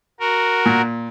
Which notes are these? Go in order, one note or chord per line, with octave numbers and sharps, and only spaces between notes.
F#4 A#4
A#2